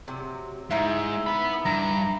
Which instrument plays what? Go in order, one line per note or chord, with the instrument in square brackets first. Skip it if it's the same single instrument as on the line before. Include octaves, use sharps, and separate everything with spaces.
[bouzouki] C3 F#3
[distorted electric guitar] G#2 [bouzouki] D#4 E4 E5
[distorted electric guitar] B3 B5
[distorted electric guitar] G2 [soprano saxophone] A#5